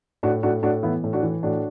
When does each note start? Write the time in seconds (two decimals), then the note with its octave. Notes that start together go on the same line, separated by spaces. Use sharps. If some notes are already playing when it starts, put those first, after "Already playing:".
0.23 A2 D4 F#4
0.43 A2 D4 F#4
0.62 A2 D4 F#4
0.83 E3 B3 E4
1.04 A2
1.13 D4 F#4
1.23 E3
1.43 A2 D4 F#4